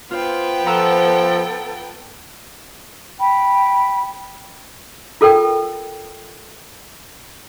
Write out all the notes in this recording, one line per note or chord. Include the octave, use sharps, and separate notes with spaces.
B3 F4 C5 G5
F3 A4 F#5 A#5 E6
G5 B5
F4 A4 A#4 G5